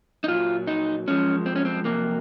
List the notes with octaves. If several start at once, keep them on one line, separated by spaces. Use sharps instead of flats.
D#4
A#2 F#3 F4
D#4
F#2 F3 G#3 C#4
C4
C#4
C4
F2 C3 F#3 A#3